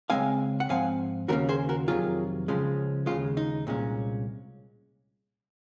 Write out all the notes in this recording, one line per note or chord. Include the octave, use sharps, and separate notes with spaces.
C#2 C#3 G#3 C4 F5 G#5
F#5
G#2 F3 C4 F5 G#5
D#2 C#3 F3 A#3 C#4 F#4 A#4
G#4 C5
F#4 A#4
F2 C3 D#3 F#3 F4 G#4
C#2 C#3 F3 G#3 C#4
D#2 C#3 G#3 F4
D#4
C2 A#2 G#3 C#4